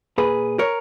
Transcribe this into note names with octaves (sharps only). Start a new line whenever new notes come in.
A#2 G#4 B4
A#4 C#5